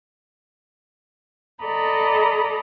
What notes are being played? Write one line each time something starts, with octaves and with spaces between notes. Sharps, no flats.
A4 D5 D#5 A#5 B5